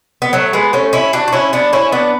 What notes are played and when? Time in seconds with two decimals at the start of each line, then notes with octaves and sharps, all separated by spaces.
0.22 B3
0.33 F#3 A3
0.53 G#3 B3
0.73 A3 C#4
0.93 C#4 E4
1.13 D4 F#4
1.28 F#4
1.33 C#4 E4
1.53 B3 D4
1.73 C#4 E4
1.92 B3 D4